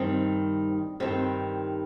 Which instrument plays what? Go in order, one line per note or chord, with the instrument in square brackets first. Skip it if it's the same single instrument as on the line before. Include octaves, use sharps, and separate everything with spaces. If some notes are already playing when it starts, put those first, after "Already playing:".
Already playing: [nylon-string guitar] G2 D#3 G3 C4
G2 D#3 G3 C4